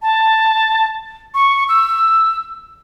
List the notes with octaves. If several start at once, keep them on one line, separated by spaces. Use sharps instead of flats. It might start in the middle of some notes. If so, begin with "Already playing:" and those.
A5
C#6
E6